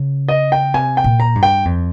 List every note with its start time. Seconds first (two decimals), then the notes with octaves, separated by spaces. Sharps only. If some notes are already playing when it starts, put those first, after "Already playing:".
Already playing: C#3
0.28 D#5
0.52 G5
0.74 C3 G#5
0.97 G5
1.04 A#2
1.20 A#5
1.35 G2
1.43 G5
1.65 F2